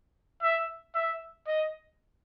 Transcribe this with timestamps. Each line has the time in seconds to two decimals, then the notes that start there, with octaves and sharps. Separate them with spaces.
0.42 E5
0.95 E5
1.47 D#5